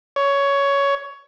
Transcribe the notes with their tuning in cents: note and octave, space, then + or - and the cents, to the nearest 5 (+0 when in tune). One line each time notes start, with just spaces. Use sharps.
C#5 +15